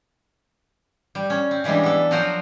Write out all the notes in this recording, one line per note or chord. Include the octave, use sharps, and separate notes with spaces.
G3
C#4
C4
C#3 E3 G3 G#3 D4
B3 A4
F3 F#3 F4 F#4 A#4 C5